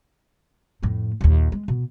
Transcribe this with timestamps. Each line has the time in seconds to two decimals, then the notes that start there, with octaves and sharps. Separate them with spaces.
0.83 F2 A2
1.21 A#1 D#2
1.52 G#3
1.68 B2